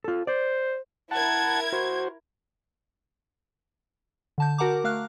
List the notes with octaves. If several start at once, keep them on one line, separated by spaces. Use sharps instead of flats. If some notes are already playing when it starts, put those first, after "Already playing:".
F4 A4
C5 D5
E4 A#4 F#5 A5 G#6
F#4 C5
D3 A5 G6
F#4 A#4 F#5 A5 A#5 D6
A3 F5 F6 F#6